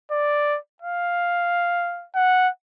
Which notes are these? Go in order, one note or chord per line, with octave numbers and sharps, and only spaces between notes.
D5
F5
F#5